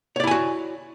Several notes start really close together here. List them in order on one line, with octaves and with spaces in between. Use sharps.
C#5 D5 E4 G#5 F#4